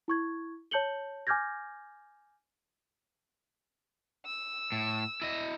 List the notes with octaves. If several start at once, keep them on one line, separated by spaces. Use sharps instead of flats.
E4 C#6 G#6
C#5 A5 G6 C#7 F#7 G7
G#5 D6 F6 G6 G#6 A#6
E6
A2
E4 D#5